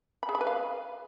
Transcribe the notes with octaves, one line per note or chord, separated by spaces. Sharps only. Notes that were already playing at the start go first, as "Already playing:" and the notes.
B5
G#4
B5
B4
F5